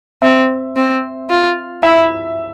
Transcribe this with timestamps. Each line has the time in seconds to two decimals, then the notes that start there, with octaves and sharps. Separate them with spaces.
0.22 C4 E5
0.76 C4
1.30 F4
1.83 E4 E5